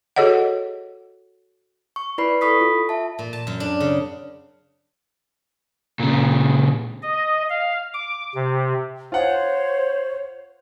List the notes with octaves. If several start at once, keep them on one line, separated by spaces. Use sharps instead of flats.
F#4 G#4 A4 C#5 D#5 F#5
C#6
E4 B4 D5 B5 C7
A4 B5 C#6 D#6 B6
F4
E5 A5
A#2
A5
F#2
D4
C#3
A#2 C#3
D#5
F5
D6
C3
F4 C5 C#5 F#5